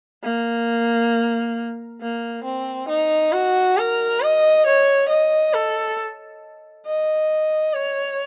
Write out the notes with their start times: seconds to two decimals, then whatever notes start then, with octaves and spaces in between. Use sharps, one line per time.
0.23 A#3
2.01 A#3
2.44 C4
2.88 D#4
3.33 F#4
3.78 A#4
4.21 D#5
4.66 C#5
5.09 D#5
5.53 A4
6.86 D#5
7.74 C#5